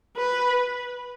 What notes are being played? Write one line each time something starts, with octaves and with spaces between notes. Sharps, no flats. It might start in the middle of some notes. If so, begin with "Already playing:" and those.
B4